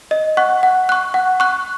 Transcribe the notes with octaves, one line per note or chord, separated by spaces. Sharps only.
D#5
F#5 C#6 F#6
F#5
C#6 F#6
F#5
C#6 F#6